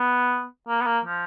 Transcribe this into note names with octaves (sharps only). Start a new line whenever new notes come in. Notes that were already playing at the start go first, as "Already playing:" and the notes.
Already playing: B3
A#3
B3
A#3
F3